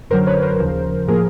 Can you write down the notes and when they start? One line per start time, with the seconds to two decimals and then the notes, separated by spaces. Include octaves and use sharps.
0.10 F#2 D3 F#3 A#4 C5
0.27 B4 C#5
0.42 A#4 C5
0.59 D#2 C#3 F3
1.08 A2 F3 A#3 G#4 A#4